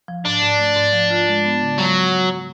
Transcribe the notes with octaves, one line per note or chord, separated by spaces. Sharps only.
F3
G#2 D4
G#2
A3
G#2
F3
F4
G#3
B3
C#3
F#3 G#3